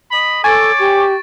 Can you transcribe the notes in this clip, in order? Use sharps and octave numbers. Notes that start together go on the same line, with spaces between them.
D#5 B5
A4 C#5 G#5 C#6 D6 A6 D7
G4